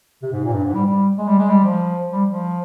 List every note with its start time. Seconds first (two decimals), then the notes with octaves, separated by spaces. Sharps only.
0.22 C3
0.33 G#2
0.44 A#2
0.53 G2
0.65 G#2
0.74 G3
0.86 G3
1.18 G#3
1.27 G3
1.39 G#3
1.49 G3
1.65 F3
2.12 G3
2.28 F3